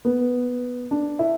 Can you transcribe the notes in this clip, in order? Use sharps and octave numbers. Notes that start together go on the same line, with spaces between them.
B3
D4
E4